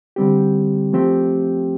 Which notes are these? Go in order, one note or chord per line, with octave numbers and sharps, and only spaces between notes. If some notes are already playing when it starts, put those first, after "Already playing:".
D3 G3 C4 G4
F3 A3 C4 G4